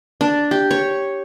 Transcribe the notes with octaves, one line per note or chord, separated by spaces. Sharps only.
D4
G4
C#5